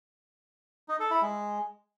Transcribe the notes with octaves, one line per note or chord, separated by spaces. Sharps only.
D#4
A4
E4
G#3